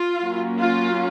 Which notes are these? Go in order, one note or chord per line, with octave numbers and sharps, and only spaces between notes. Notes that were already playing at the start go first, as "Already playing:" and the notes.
Already playing: F4
F#3 A#3 C#4
F4